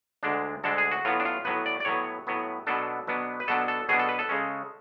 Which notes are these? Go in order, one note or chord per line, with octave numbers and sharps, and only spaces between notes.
D2 D3 G#3 D4
D2 D3 G#3 D4 A4
G#4
F#4
A2 F#3 B3 F4
D4
F4
A2 F#3 B3 B4
D5
D5
A2 F#3 B3 C#5
A2 F#3 B3
B2 F#3 B3 D4 A4
B2 F#3 B3 D4
B4
B2 F#3 B3 D4 A4
A4
B2 F#3 B3 D4 G#4
A4
B4
A4
C#3 G#3 C#4